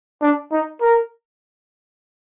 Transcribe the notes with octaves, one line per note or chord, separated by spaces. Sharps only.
D4
D#4
A#4